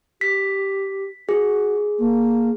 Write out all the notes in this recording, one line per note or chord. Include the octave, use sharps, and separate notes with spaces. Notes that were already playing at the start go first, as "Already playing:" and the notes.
G4 B6
F#4 G#4
A#3